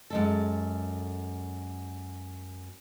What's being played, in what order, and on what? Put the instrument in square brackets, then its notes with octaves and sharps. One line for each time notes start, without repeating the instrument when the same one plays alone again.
[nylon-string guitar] F#2 G#3 A4